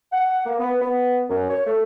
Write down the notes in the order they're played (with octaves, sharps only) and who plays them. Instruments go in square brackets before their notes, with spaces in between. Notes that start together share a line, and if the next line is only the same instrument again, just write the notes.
[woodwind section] F#5
A#3
B3
B3
F#2
C#5
A3